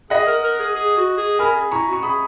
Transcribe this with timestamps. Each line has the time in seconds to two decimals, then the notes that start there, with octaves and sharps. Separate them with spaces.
0.10 G#4 D#5 F#5
0.26 A#4
0.44 A#4
0.59 G#4
0.75 G#4
0.97 F#4
1.17 G#4
1.39 A#4 G#5 B5
1.55 G#4
1.71 E4 A#5 C#6
1.87 F#4
1.93 C#6
2.03 G#4 B5 D#6